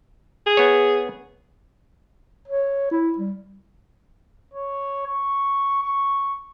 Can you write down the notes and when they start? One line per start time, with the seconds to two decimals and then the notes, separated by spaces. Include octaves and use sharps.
0.46 G#4
0.57 B3 C#5
2.48 C#5
2.91 E4
3.18 G3
4.54 C#5
5.07 C#6
5.83 C#6